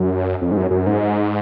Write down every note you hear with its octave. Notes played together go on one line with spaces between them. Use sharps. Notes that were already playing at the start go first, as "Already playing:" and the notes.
Already playing: F#2
F2
G#2
F#2
F#2
G#2